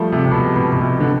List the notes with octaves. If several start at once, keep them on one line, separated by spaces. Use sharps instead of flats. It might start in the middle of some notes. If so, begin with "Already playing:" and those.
Already playing: F3 G3 A3
C3
C3
B2
B2
B2
C3
D3